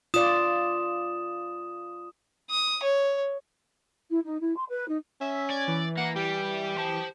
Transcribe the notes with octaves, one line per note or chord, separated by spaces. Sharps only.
F4 D5 D#6 E7
D#6
C#5
E4
D#4
E4
C6
B4
D#4
C#4 E5
D5 G#6
E3
A#3 F#5
G3 G4
C5 A5